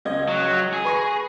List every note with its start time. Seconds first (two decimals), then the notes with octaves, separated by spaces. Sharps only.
0.05 C#2 D#5 G#6
0.28 F#3
0.73 G#4
0.85 B4 C#6 A#6